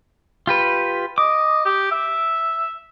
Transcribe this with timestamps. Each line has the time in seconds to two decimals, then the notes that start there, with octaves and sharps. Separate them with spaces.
0.47 F4 G4 B4
1.18 D#5 D6
1.65 G4
1.91 E5